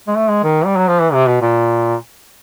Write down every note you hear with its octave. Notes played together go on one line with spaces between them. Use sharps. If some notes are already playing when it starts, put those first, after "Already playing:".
G#3
A3
G#3
D#3
G3
F#3
F3
E3
C3
B2
A#2